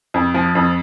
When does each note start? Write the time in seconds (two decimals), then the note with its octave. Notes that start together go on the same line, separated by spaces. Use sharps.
0.14 F2
0.34 F3
0.55 F2